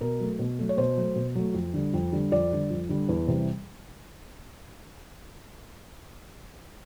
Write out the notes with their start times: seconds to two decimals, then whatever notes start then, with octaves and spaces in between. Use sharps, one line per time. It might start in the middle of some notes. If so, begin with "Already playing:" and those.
0.01 B2 A#4
0.20 F#3 A3
0.39 B2
0.59 F#3 A3
0.69 C#5
0.77 B2 C5
0.97 F#3 A3
1.16 B2
1.35 F#3 A3
1.54 F2
1.74 D3 G3
1.94 F2
2.13 D3 G3
2.32 F2 D5
2.51 D3 G3
2.70 F2
2.89 D3 G3
3.09 E2
3.28 C3 E3 G3